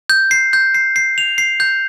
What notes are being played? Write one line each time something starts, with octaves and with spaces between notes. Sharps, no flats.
G6
C7
G6
C7
C7
F7
C7
G6